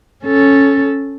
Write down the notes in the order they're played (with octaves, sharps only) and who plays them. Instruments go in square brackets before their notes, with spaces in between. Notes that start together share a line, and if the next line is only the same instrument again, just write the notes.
[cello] C#4 A4